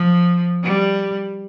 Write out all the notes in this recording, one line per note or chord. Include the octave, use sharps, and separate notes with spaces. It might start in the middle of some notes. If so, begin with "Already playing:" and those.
Already playing: F3
G3